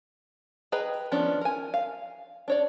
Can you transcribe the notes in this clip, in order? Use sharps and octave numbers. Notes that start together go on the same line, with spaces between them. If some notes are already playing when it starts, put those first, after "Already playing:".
G#4 B4 D#5 G5 A#5
D#3 F3 B3 C#4 D4
A#4 G#5
F5
D4 C#5 D5